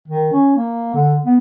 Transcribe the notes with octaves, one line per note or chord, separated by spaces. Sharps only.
D#3
C#4
A#3
D3
B3